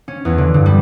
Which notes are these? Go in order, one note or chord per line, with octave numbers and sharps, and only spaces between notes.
C#4
E2
D3
G2
G3